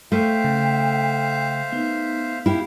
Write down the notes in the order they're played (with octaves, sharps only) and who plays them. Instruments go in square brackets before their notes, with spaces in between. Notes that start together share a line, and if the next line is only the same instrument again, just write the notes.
[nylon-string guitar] A3 [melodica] C5 E5 F5 [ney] G5
[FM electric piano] C#3
[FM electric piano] B3 [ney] D#4
[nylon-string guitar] E4 G4 [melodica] F5